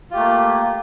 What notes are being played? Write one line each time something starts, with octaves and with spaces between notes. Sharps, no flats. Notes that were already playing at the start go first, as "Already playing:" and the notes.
A3 A#3 F4 G4